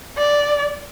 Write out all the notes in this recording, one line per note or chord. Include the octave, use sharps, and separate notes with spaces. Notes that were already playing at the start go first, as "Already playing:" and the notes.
D5